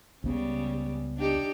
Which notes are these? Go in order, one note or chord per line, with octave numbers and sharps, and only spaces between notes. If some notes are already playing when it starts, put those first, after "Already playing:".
C#2 C#3 G3 B3
D4 D#4 G4